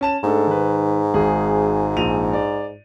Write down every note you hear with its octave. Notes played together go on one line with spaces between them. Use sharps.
C#4 A5 E7
G#2 A3 D4 A4
D#3 B4
G#1 G#4
A#1 D#7 F7
D5